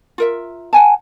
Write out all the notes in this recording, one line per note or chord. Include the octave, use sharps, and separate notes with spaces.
F4 A#4 E5
F#5 G#5 A5